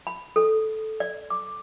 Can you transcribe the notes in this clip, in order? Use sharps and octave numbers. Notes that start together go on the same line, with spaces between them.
B5
A4
D5
D6